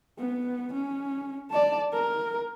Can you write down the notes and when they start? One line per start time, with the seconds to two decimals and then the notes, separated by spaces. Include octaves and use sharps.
0.19 B3
0.74 C#4
1.51 D5 A5
1.93 A#4